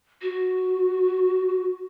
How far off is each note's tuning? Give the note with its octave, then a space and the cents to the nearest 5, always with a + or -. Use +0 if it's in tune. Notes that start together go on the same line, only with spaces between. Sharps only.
F#4 +0